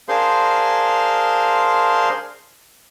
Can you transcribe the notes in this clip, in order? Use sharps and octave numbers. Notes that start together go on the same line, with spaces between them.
D4 G#4 A#4 C5 F5 C6